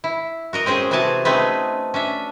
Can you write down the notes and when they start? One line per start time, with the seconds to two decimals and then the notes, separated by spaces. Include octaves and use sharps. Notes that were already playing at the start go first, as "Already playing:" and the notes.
0.04 E4
0.53 F#4 A#4 D#5
0.66 C4 C#4 G#4 C5
0.91 C3 E3 F#4 G#4 G#5 A5
1.25 A3 C4 C#4 D#4 G#4 B4
1.94 C#4 D4 E5